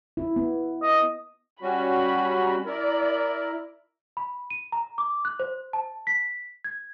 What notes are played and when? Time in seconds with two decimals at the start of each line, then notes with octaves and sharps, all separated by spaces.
0.17 E4
0.36 B3
0.83 D#5
1.62 G3 C#4 F#4 B5
2.66 E4 A#4 D5
4.17 B5
4.50 D#7
4.72 A#5
4.98 D6
5.25 F#6
5.40 C5
5.73 A5
6.07 B6
6.64 G#6